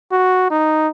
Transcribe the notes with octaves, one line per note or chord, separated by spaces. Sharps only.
F#4
D#4